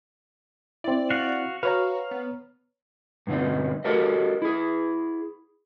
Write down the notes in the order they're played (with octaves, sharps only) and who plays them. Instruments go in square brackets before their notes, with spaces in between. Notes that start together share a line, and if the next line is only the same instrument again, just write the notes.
[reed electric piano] C4 E4 [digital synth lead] D5
[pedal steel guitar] F#4 F5 F#5
[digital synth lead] F#4 [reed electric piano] B4 C#5 A#5 [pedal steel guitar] F5
[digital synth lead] B3
[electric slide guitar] G2 B2 D3 C4 D#4
F#4 G4 A4 A#4 D#5
E4 G#4